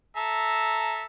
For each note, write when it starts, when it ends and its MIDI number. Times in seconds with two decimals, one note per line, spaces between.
0.16 1.03 69
0.16 1.03 76
0.16 1.03 82